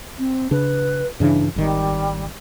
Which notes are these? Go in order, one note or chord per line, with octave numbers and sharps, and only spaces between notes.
C4
C#3 D4 B4
G2 C#3 E3 D4
G#1 D#3 G3